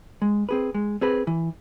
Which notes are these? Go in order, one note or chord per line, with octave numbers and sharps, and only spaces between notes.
G#3
C4 G#4 B4
G#3
C4 G#4 B4
E3